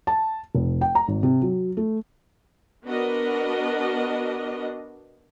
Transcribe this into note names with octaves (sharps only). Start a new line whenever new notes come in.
A5
F1
G5
A#5
G#1
C3
F#3
A3
B3 D4 F#4 A#4 D#5